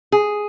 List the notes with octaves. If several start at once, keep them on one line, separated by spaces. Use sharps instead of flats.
G#4